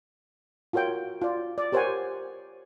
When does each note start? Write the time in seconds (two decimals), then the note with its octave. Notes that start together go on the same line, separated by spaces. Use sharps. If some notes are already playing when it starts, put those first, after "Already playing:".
0.73 F4 F#4 A#4 C#5 G5
1.22 F4 D5
1.58 D5
1.72 G4 A#4 C5 C#5 F#5 G#5